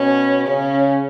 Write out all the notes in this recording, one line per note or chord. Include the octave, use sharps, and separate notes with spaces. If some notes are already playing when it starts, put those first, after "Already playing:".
Already playing: B2 C#4
C#3 C#4